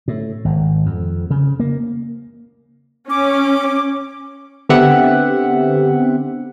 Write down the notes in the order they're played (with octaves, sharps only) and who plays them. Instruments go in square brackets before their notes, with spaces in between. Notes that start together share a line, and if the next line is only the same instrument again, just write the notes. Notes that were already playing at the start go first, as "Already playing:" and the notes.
[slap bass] A2
G#1
F2
C#3
A#3
[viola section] C#4 [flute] D6
[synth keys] D3 B3 C4 G4 E5 F#5